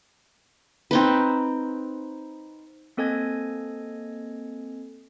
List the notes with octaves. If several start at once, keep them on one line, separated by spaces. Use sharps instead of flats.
C4 D#4 B4
A#3 C4 A4 D#5 G#5 G#6